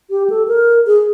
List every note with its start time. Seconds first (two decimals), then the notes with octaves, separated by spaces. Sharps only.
0.10 G4
0.30 A4
0.48 A#4
0.87 G#4